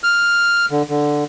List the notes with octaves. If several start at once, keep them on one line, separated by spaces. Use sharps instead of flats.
F6
D3
D3